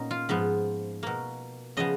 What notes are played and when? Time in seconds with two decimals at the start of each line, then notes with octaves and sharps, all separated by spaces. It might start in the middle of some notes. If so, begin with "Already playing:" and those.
Already playing: A#2 B3 C#4 D#4
0.11 F4
0.29 G#2 F3 B3
1.03 B2 A#3
1.77 C#3 F3 B3 D#5